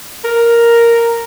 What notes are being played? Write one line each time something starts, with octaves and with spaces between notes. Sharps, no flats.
A#4